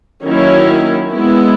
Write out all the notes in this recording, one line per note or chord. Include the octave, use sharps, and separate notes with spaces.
D#3 F#3 A#3 C#4 E4
G#3 B3 E4